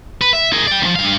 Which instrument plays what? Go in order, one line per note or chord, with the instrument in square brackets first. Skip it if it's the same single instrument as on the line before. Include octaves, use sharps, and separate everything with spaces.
[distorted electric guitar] B4
E5
G#4 A#4
D5 G5
D2 F3
G2 F5